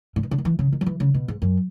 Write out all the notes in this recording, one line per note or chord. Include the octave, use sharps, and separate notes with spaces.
A#2
B2
C#3
D#3
E3
C#3
D#3
F#3
E3
C#3
B2
G#2
F#2